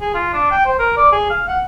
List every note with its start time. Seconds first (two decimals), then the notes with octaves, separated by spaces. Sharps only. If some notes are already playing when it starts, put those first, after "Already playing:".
0.01 G#4
0.15 F4
0.34 D4
0.51 G5
0.66 C5
0.79 A#4
0.97 D5
1.12 G#4
1.30 F5
1.48 F#5